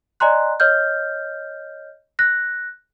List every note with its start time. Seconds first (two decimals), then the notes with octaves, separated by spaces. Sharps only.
0.20 D5 D#5 G#5 A#5 C6 F#6
0.60 C#5 D#5 F6 G6
2.19 F#6 A#6